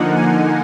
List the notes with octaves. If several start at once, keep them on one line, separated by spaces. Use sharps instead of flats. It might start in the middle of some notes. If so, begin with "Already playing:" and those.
Already playing: D3 F3 A#3 D#4 F#5
G#5